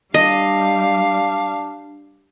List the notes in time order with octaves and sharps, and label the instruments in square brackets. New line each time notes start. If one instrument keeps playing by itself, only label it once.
[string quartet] G3 F5 [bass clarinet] D4 [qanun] D#5